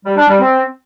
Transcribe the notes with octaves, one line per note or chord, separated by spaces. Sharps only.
G3
D4
G3
C4